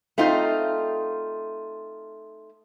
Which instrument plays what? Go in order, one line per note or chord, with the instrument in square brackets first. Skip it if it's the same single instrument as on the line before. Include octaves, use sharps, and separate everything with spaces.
[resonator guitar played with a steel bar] A3 C4 D#4 F4